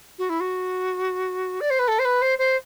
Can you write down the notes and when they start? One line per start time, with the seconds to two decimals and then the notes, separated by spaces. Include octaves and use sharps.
0.19 F#4
0.29 E4
0.40 F#4
1.61 D5
1.70 C5
1.79 B4
1.88 A4
1.99 C5
2.05 B4
2.22 C5
2.38 C5